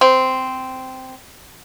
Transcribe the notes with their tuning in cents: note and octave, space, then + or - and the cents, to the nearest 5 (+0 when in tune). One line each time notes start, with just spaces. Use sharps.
C4 -10